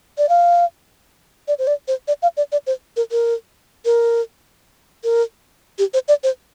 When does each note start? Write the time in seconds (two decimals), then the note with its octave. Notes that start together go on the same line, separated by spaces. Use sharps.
0.18 D5
0.29 F5
1.48 D5
1.59 C5
1.67 D5
1.88 C5
2.08 D5
2.22 F5
2.37 D5
2.52 D5
2.67 C5
2.97 A#4
3.11 A#4
3.85 A#4
5.04 A#4
5.79 G4
5.94 C5
6.08 D5
6.24 C5